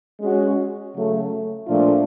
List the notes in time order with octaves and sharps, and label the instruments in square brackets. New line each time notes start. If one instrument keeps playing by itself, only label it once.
[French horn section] G#3 C#4 F#4
C#3 F#3 A3
A#2 F3 A3 D4 F4